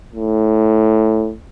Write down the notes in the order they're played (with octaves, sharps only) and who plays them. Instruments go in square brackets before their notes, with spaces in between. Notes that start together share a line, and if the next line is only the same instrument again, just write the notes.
[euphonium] A2